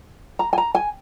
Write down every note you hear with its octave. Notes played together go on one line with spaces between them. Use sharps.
A#5
G#5
A#5
G#5